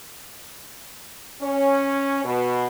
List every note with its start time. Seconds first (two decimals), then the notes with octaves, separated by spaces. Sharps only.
1.42 C#4
2.24 B2